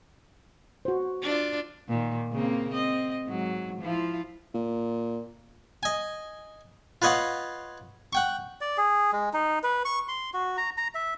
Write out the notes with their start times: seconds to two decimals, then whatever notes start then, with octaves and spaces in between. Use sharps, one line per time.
0.85 F#4 C5
1.22 D4 F4
1.88 A#2 D#3
2.32 C#3 A#3 C4
2.70 C4 D#5
3.26 G#2 F#3
3.81 F3 E4 F4
4.54 A#2
5.83 D#5 G#5
7.02 F4 B4 C#5 D#5 F5 F#5
8.13 F#5 G5 C#6
8.61 D5
8.78 G#4
9.13 G#3
9.34 D#4
9.63 B4
9.85 C#6
10.08 C6
10.34 F#4
10.57 A#5
10.77 A#5
10.95 E5